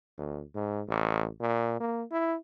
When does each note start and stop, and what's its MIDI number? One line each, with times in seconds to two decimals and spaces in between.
0.18 0.43 38
0.55 0.82 44
0.88 1.28 33
1.41 1.78 46
1.80 2.03 58
2.11 2.36 64